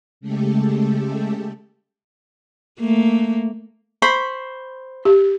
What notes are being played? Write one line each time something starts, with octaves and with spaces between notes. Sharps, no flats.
C#3 G#3 A3 G4 A4
A3 A#3
C5 B5 C#6
G4